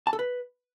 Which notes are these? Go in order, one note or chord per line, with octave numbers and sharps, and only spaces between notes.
A5
A4
B4